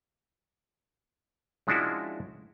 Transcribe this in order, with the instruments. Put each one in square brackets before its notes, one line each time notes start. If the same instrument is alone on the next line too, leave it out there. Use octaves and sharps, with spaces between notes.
[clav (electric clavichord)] F3 G#3 C#4 D4 E4 F#4